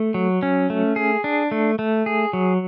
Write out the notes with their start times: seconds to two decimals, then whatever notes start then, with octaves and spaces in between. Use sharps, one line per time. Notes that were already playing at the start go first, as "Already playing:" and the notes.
Already playing: A3
0.14 F#3
0.43 C#4
0.70 A3
0.96 G#4
1.24 D4
1.51 A3
1.79 A3
2.06 G#4
2.33 F#3